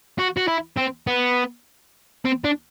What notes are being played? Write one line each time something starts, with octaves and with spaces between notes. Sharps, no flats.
F#4
F#4
E4
C4
B3
C4
D4